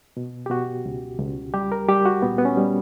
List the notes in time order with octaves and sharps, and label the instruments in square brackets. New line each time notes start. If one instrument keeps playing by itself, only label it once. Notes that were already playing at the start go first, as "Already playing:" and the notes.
[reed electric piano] B2
G4
B2 F#4
C#2
C#2
G3 G4
A#4
G3 G4
F#4
A#2 B3
B3
C#4
G3